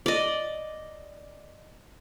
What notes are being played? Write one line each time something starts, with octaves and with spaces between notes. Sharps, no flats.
D5 D#5